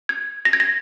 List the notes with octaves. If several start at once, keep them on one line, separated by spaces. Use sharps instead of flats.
G#6
A#6
G#6
A#6